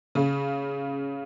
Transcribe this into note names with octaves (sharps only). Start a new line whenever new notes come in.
C#3